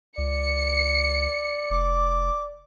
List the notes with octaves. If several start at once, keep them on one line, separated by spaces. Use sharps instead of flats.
C#2 D5 C#7
F1 D6